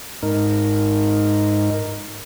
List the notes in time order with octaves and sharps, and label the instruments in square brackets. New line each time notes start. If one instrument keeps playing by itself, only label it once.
[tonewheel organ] G#2 D#4 A#4